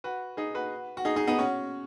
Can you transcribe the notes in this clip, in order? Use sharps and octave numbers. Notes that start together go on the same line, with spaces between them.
F#4 B4
D#4 G#4
F#4 B4
F#4
D#4 G#4
D#4 G#4
B3 D#4
C#4 F#4